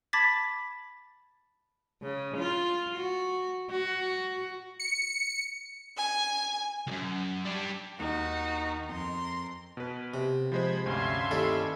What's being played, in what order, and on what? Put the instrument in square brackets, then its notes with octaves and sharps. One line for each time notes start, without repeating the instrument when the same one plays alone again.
[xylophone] A5 B5 D6 G#6 A6 B6
[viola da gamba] C#3
F4
F#4
F#4
[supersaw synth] C#7
[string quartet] G#5
[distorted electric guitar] C#2 F#2
G3 D4
[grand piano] D#2 [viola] D#4 [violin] F#4
[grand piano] F2 [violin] A#4 C6
[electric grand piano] B2 B4
[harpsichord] C3
[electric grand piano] F3 G#3 C5 [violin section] B5 G#6
[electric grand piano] D2 [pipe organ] G2 C#4 G#6 [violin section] E5 F5 C6
[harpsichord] D#2 E4 [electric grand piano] A4 D5